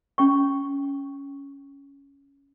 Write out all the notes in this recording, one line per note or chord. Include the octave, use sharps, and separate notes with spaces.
C#4 G5 C#6